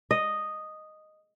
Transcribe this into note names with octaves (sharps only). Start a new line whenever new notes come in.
D#5